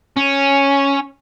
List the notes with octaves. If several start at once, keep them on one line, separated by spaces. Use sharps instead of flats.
C#4